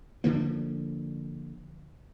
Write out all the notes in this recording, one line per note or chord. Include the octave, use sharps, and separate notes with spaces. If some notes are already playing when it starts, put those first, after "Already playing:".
D3 F3 A#3